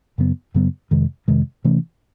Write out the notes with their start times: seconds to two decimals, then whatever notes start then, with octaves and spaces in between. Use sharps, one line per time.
0.18 F#2 C#3 F#3 B3
0.54 F#2 C#3 F#3 B3
0.91 F2 C3 D#3 G#3
1.28 F2 C3 D#3 G#3
1.64 C3 E3 A3 C#4